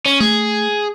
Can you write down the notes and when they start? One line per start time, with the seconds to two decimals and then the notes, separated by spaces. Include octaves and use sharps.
0.06 C#4
0.20 A3 G#4